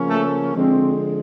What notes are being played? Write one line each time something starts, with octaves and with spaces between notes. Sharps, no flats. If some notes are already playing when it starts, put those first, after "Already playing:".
Already playing: C#3 F3 A#3 C#4
A3 A4
D3 F3 G#3 C4